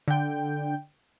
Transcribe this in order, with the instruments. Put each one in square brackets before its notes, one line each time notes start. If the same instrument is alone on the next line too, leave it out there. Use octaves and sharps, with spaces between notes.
[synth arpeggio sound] D3 G5